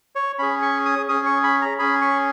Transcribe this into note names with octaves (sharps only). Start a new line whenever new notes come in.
C#5
C#4 G#4 B5
C#6
D#6
C#4 G#4 D#6
C#6
B5
A#5
C#4 G#4 B5
C#6